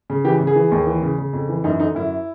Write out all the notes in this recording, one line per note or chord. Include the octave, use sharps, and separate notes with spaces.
C#3
E3 G4
C#3
G#4
E3
D#2
E3
C#3
C#3
F2
E3
F#2 D#4
D3 D#4
F#2 E4